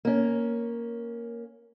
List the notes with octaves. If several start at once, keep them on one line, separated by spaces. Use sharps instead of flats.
A#3 C#4